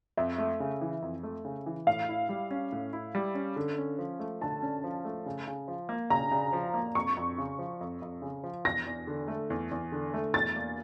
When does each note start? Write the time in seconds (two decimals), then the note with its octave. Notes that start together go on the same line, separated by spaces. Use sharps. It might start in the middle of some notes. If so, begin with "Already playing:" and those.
0.17 F2 E5
0.38 A3
0.60 C#3
0.81 E3
1.02 F2
1.23 A3
1.45 C#3
1.66 E3
1.87 A2 F5
2.09 E4
2.29 G3
2.51 C#4
2.72 A2
2.93 E4
3.15 G3
3.35 C#4
3.56 D3
3.78 C#4
3.98 F3
4.20 A3
4.41 D3 A5
4.62 C#4
4.84 F3
5.05 A3
5.26 C#3
5.47 C#3
5.68 F3
5.89 A#3
6.10 C#3 A#5
6.31 C#3
6.53 F3
6.74 A#3
6.95 F2 C#6
7.17 F2
7.38 C#3
7.59 F3
7.81 F2
8.02 F2
8.22 C#3
8.44 F3
8.65 E2 A#6
8.86 E2
9.07 D3
9.28 A3
9.50 E2
9.71 E2
9.92 D3
10.14 A3
10.34 E2 A6
10.56 A#3